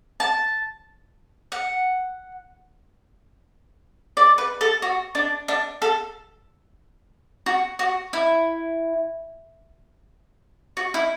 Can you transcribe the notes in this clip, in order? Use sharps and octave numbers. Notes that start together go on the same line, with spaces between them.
A5
F#5
D5
B4
A4
F#4
D4
D4
A4
F#4
F#4
E4
F#4
E4